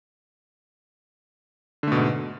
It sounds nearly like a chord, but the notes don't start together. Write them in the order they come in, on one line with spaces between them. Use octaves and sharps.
D3 A3 B2 G#2